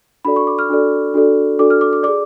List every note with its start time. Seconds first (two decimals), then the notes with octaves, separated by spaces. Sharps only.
0.25 D4 F#4 A4 D5 B5
0.36 C#6
0.47 D6
0.59 F6
0.69 D4 F#4 A4 D5
1.14 D4 F#4 A4 D5
1.59 D4 F#4 A4 D5 D6
1.70 F6
1.81 D6
1.93 D6
2.03 G#4 D5 D6